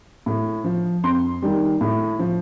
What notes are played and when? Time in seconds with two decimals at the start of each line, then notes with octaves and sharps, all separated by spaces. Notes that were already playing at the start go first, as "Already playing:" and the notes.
0.26 A2
0.64 F3
1.03 F2 C6
1.42 D#3 G3
1.81 A2
2.19 F3